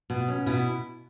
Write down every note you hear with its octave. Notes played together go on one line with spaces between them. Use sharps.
B2
C#4
B2 E4